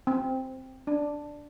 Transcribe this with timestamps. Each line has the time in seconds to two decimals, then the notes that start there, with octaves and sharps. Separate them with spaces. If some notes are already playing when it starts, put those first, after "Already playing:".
0.07 C4
0.87 D4